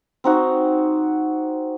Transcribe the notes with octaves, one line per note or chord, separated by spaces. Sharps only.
C4 D#4 F#4